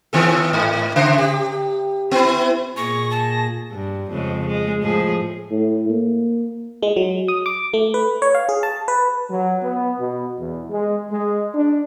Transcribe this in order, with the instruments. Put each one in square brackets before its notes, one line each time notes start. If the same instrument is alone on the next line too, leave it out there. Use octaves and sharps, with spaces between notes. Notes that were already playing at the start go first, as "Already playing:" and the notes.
[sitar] D#3 B3 A4
G#2
C#3 C5
G4
B3 E4
[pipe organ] A#2 G#4 A#6 [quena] C#6
[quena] A5
[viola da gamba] G2
F2 C#3 G#3
G#3
A2 F3 G#4
[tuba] A2
A#3
[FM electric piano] G#3
F#3
D#6
D6
A3
B4
C#5
F5
G#4
A5
B4
[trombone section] F#3
B3
B2
E2
G#3
G#3
D4